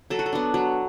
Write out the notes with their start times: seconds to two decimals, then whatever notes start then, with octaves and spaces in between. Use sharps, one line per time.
0.10 F#3 A4
0.19 F#4
0.26 A4
0.33 B3 D4
0.54 F#3